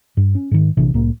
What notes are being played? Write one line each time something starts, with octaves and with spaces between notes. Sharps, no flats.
G2
C#4
G#2 D#3
A#1 C3 E3 D4
C2 A2 A#3